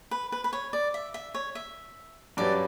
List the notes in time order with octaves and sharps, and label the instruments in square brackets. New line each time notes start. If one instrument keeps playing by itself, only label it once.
[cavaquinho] B4
B4
B4
C#5
D5
E5
E5
C#5
E5
[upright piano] G2 F#3 C#4 G4 B4 [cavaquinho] D5